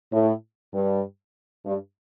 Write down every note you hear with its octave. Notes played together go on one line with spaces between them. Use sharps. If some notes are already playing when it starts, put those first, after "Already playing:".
A2
G2
G2